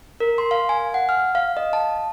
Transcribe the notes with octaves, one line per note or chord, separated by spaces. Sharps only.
A#4
C6
F5
G#5
F#5
F6
F5
D#5
A5